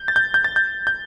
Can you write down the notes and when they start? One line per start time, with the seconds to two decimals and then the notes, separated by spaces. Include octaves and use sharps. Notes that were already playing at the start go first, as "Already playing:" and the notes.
Already playing: G6
0.08 A6
0.16 G6
0.34 G6
0.44 A6
0.56 G6
0.87 G6